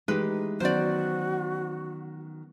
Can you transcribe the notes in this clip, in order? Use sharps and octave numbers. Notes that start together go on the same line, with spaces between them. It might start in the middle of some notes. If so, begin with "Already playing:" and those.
E3 G#3 A3 D#4 G4 B4
D#3 F#3 B3 C#4 F#4 C5 D5